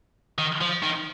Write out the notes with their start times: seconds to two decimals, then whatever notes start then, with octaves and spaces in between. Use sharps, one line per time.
0.38 D#3
0.61 F3
0.82 D#3